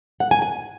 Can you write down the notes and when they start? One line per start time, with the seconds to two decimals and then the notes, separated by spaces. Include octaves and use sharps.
0.20 F#5
0.31 G#5
0.42 G#5